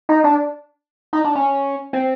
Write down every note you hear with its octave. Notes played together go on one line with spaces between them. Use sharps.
D#4
D4
D#4
D4
C#4
C4